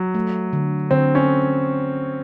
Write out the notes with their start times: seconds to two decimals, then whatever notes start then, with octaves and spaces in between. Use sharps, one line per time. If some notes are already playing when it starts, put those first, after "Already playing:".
Already playing: F#3
0.14 A3
0.53 D3
0.91 D3 C4
1.15 C#4